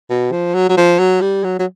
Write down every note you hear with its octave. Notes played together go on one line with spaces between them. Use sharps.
B2
F3
F#3
F#3
F3
F#3
G3
F#3
F#3